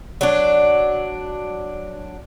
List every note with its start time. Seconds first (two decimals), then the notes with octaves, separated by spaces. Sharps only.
0.21 F#3 D4